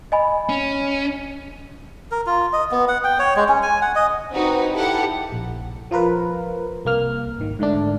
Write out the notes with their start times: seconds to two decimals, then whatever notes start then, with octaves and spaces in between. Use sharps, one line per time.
0.12 D#5 G#5 B5
0.49 C#4
2.11 A#4
2.26 F4
2.53 D#5
2.71 B3
2.88 F#5
3.04 G5
3.19 C#5
3.36 G#3
3.49 C#4
3.63 G#5
3.82 F#5
3.95 D#5
4.33 C4 D#4 F#4 B4
4.74 E4 G4 A4 F#5
5.32 A#1
5.91 F3 F4 A#4 B4
6.85 C2 A#3 F6
7.38 G#1 D#3
7.59 G#2 D3 A3 D4